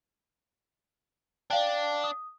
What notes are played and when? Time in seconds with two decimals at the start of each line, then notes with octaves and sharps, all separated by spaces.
1.50 D4 D5 F5 G5
2.04 D#6